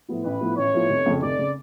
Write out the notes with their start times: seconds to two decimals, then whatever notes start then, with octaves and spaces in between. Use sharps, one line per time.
0.08 A2 F3 B3 F4
0.24 A1 B4
0.41 A2 F3 B3 F4
0.57 A1 C#5
0.74 A2 F3 B3 F4
0.90 F1
1.06 F2 C#3
1.22 F1 D5
1.39 C#3